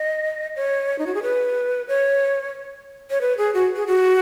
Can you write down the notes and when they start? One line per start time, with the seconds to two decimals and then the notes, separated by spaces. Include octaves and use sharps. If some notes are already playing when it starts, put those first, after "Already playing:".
Already playing: D#5
0.56 C#5
0.99 D#4
1.07 F#4
1.14 G#4
1.23 B4
1.88 C#5
3.11 C#5
3.21 B4
3.38 G#4
3.54 F#4
3.76 G#4
3.87 F#4